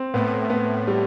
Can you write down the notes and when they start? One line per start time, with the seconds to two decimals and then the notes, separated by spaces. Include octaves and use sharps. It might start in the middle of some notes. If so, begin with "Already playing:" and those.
Already playing: C4
0.14 A2 B3
0.50 B3
0.87 G3